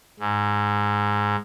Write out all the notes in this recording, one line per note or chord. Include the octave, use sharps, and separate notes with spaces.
G#2